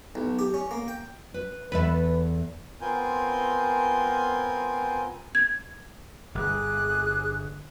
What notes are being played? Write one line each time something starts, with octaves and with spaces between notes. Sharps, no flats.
B1
G4
C#4
A#3
G5
B4
E2 A4 B4 E5
B3 C4 F4 A#4 G#5 G6
G#6
G1 G#4 D6 F#6